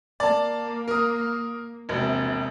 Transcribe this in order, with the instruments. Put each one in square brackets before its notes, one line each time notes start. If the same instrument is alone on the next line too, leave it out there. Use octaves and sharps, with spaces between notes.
[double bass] A#3 [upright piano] D5 A5
[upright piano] A#4 D#6
[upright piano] E1 A#1 [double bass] C3